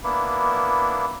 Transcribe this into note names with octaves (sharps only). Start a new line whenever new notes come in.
A#3 B3 D4 E4